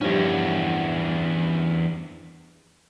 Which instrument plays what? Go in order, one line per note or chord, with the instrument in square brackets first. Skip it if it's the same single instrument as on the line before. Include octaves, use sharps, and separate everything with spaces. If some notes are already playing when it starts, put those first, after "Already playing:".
[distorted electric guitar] E2 C#4 [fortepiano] G2 F3 G3